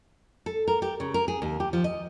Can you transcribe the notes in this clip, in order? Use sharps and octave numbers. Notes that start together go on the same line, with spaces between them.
A4
A#4
G4
C#3
A#4
G#4
D#2
G4
F3
D#5